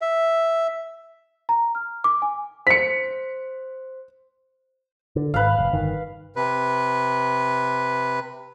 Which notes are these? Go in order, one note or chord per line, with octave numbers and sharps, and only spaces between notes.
E5
A#5
F6
D6
G#5
C5 B6 C#7
D3
G#1 B4 F5
F1
G1 D#3
C3 B4